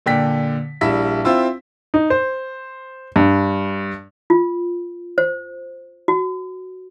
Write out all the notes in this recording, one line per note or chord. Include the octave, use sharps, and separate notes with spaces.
A#2 D3 G5 B6
A#1 G3 E4 E5 B6
C4 E4 F4 E6
D#4
C5
G2
F4
C5
F#4